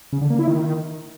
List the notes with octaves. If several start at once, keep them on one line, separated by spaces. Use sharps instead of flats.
C#3
D3
A#3
E4
D#3